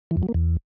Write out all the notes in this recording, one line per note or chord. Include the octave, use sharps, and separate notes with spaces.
E3
F2
F#3
A#3
E2